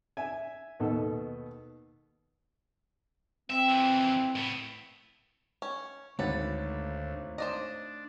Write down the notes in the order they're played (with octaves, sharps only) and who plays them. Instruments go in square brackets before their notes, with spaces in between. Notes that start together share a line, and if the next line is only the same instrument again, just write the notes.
[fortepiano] E5 G#5
D#2 B2 A4
[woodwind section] C4 [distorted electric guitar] E5
[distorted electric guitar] F2 E3
A2 B3
[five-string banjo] C#4
[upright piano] G#1 A6 [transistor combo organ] D2 [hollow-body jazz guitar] A3 C#5 F#5 [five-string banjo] B4
[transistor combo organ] D4 [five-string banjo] C5 D5 D#5